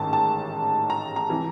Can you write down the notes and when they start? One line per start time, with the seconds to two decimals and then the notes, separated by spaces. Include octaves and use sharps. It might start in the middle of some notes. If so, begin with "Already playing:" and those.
Already playing: A1 G#2 D#3 A5
0.13 A5
0.90 A#5
1.16 A#5
1.29 C3 E3